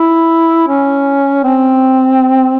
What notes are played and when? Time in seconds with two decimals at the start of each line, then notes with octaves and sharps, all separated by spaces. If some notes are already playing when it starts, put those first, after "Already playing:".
Already playing: E4
0.68 C#4
1.44 C4